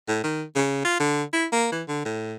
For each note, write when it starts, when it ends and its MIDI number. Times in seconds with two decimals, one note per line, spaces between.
0.08 0.20 45
0.24 0.44 51
0.55 0.82 49
0.85 0.99 65
0.99 1.23 50
1.33 1.47 64
1.52 1.68 58
1.72 1.83 52
1.88 2.03 50
2.05 2.36 45